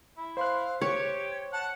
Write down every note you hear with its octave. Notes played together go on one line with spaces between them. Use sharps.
E4
C5 F5 C6 F#6
G4 C#5 G#6
F#5 A5